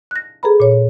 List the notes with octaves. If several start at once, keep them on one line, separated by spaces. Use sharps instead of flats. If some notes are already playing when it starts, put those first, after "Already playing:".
F#6 A#6
G#4 A4 B4 A#5 B5
A#2 C#5